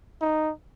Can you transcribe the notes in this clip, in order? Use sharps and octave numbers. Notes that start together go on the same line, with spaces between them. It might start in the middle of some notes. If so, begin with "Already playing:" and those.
D#4